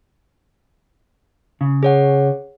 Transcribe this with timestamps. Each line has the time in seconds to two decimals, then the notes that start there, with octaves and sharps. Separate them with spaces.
1.61 C#3
1.83 G#4 C#5 F#5